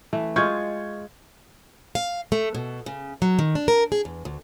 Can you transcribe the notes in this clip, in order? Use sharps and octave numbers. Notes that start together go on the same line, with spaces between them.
E3 A3
G#3 F4 C#6 G6 G#6
F5
A3
B2
C#3
F#3
D#3
D4
A#4
G#4
E2
D2